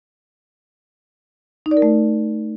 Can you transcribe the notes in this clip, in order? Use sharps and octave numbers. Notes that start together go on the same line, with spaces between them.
D#4
D5
A#4
A3